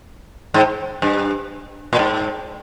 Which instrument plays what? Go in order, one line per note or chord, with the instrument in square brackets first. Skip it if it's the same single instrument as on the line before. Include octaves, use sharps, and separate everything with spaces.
[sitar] G#2
G2
A#2
G#2